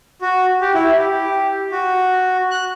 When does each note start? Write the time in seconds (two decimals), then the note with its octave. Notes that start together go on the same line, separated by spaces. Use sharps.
0.21 F#4
0.61 G4
0.74 E4
0.98 G4
1.72 F#4
2.51 F#6